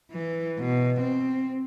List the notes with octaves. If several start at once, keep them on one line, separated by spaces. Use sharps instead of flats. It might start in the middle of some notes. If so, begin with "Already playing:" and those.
E3
B2
C4